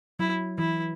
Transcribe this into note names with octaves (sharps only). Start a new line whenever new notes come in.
F#3 E4
E3 E4